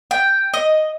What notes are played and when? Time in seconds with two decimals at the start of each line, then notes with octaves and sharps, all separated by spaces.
0.11 G5
0.54 D#5